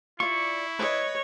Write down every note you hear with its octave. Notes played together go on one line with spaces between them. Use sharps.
E4 F4 D5 C#6
B4 C#5 D#5